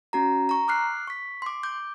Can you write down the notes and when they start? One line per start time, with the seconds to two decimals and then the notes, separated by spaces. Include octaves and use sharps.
0.13 C#4 F#4 A#5
0.49 A#5 C#6
0.68 D6 F6 F#6 C7
1.07 C#6 B6
1.42 C6 D6
1.63 D6 G6